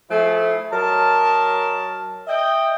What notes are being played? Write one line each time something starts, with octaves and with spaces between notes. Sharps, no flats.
F3 A3 E4 G#4
F#3 A#4 D#5 A5
D#5 E5 G5